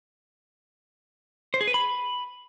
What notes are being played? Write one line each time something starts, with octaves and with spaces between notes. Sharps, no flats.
C5
G#4
B4
B5